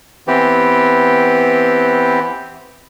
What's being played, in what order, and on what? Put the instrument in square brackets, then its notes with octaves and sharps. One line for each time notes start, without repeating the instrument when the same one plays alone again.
[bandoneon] E3 B3 C4 G4